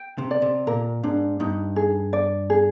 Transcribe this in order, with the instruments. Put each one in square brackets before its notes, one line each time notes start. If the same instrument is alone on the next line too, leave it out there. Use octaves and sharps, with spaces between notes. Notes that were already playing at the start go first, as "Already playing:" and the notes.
Already playing: [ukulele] G5
[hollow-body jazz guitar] C3
[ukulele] D5
[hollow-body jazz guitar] C3
[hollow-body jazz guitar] A#2 [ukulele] A#4
[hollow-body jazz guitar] G#2 [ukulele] D4
[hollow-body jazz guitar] G2 [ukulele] D#4
[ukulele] G#4
D5
G#4